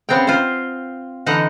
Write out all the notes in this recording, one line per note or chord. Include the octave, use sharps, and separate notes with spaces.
C#3 B3 C4 C#5 G5
F4 C5
D3 E3 D#4 D#5 F#5